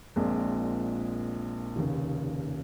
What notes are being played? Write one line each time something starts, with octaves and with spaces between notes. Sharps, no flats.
A#1 A#2 G#3 C4
F1 D#2 C#3